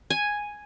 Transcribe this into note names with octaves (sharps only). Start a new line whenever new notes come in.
G#5